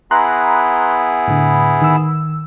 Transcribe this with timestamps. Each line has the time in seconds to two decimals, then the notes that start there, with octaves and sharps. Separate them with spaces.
0.11 B3 E4 G#4 A#5 C6 F#6
1.27 A2 D3
1.82 D#3 E6